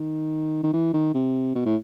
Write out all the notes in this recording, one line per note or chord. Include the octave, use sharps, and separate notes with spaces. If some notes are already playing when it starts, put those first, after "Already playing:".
Already playing: D#3
D#3
E3
D#3
C3
B2
A2